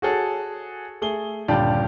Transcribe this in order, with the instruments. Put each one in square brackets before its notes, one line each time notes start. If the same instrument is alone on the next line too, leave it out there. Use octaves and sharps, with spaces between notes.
[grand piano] F#4 G#4 A4 C#5
A3 G#4 G7
D#1 G2 D3 F4 G4 D5